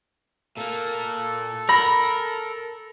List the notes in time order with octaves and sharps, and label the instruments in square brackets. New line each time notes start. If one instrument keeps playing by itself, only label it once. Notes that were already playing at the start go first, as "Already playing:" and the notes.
[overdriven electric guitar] A#2 A#3 [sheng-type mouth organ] A4
[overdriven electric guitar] A#4 [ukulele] B5 [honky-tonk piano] A#6